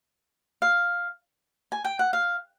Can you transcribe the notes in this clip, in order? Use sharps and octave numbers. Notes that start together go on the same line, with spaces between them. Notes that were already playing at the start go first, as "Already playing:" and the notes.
F5
G#5
G5
F#5
F5